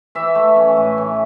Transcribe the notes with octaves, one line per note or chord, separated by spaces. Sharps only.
E3 E5
A3
C#4
A2
E3